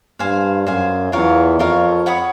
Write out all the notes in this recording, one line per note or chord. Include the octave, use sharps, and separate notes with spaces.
G2 C5 F5 G#5
F#2 C5 F5 G#5
E2 F4 A#4 C#5 F5
F2 F4 A#4 C#5 F5
C#5 F#5 B5 D#6